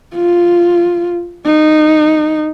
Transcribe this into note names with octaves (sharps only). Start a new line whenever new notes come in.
F4
D#4